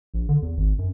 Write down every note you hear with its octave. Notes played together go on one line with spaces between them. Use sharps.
A#1
D3
E2
G#1
F#2